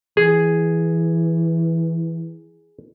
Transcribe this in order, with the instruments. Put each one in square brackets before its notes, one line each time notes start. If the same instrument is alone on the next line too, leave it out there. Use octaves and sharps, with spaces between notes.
[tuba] E3 [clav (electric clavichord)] G#4